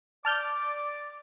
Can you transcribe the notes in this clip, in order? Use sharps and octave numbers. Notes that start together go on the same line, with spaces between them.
D5 A5 D6 F6 G6